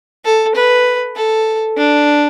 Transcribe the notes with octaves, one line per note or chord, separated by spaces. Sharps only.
A4
B4
A4
D4